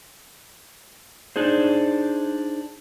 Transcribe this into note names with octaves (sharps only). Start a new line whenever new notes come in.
D4 D#4 G#4 C5